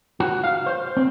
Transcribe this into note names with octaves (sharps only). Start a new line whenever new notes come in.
F#4
F5
C5
C4